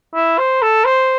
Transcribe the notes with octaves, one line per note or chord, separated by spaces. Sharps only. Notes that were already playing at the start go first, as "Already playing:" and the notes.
E4
C5
A4
C5